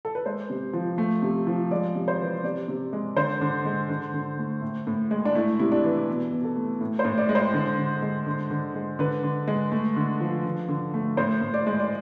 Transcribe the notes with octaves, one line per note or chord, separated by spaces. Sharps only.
A4
B4
G#3 C5
C3
F3
A3
C3
F3
G#3 D5
C3
C5
E3
C3 D5
C3
G#3
D3 C5
D3
G#3
D3
D3
A3
A2
A2
G#3
D4
A3 E4
C3 E4
D4
E3
B2
B2
A4
A3
A2
C5
A2
D5
G#3
C5
D3
D3
G#3
D3
D3
G#3
D3 B4
D3
G#3
A3
D3
F3
D3
D3
A3
A2 C5
A2
D5
G#3
D5